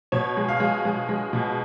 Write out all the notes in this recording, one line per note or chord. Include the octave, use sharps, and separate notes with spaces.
B2 C#5
G#3
F5
G#3
G#3
G#3
B2